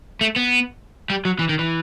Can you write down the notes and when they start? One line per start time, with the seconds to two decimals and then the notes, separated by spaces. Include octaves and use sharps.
0.21 A3
0.36 B3
1.10 G3
1.25 F#3
1.39 E3
1.49 D#3
1.59 E3